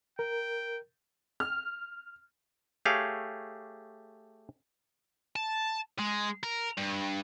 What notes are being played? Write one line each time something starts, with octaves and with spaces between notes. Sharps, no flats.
A#4 G5
F6
A3 G4 G#4 C#5 F5
A5
G#3
A#4
G2